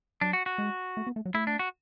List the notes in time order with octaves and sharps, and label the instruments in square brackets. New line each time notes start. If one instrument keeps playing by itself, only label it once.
[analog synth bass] F#3 [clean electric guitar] D4
[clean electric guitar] F#4
F#4
[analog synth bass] G#3
A3
B3
A3
F#3
[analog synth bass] A3 [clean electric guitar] E4
[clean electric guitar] D4
F#4